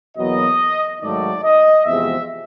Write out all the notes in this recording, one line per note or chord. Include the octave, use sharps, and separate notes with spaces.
E2 B2 F#3 A#3 D#5
G#2 D#3 F#3 A3 D5
D#5
E2 C3 F3 G#3 E5